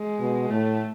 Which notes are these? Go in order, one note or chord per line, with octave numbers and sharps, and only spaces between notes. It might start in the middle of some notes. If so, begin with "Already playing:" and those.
Already playing: G#3
B2
A2 A3